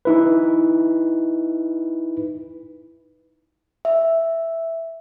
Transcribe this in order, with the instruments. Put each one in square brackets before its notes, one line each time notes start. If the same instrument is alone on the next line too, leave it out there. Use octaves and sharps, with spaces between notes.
[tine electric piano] D#4 E4 B4
[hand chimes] E5